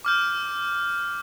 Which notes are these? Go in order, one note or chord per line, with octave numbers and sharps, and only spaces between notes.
D6 F6 G6